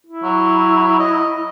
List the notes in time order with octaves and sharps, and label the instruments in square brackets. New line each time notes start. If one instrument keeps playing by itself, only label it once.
[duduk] E4
[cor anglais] F#3
D#5